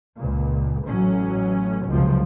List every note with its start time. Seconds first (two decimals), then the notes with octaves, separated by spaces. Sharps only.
0.17 C#2 A#2
0.86 A1 A2 F#3 C#4
1.87 F1 C#2 F#2 C3 F3